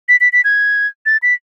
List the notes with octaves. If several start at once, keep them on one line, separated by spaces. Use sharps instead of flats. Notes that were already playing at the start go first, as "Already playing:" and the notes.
B6
B6
B6
G#6
A6
B6